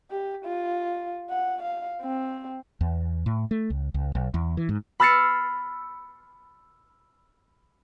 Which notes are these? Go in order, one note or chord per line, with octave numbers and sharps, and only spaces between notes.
G4
F4
F#5
F5
C4
E2
A2
A3
C#2
C#2
B1
E2
E3
G#2
B5 E6 F6 A6 C7 C#7